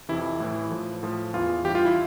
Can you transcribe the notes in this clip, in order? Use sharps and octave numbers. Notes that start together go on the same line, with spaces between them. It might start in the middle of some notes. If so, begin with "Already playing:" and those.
F2 C3 E3 E4
A2 E3
A2 F3
A2 F3
E2 E3 F4
G2 E3 G4
F4
E4